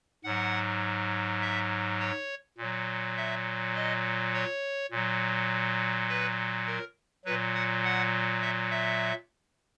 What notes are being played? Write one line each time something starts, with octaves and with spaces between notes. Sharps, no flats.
G#2 F#3 F#5
E5
C#5
A#2 F#3
E5
D#5
C#5
A#2 F#3
B4
A#4
A#2 F#3 B4
F#5
F#5
E5
E5